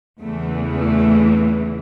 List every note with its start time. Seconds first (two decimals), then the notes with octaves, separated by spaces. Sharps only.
0.20 E2 C#3 E3 A3
0.72 A3